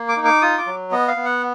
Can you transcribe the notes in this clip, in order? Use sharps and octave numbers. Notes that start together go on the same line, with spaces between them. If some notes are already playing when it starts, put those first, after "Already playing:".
Already playing: A#3
D6
D#4
D6
F4 D#6
D6
F#3
B3 D#5
F5
B3
F#5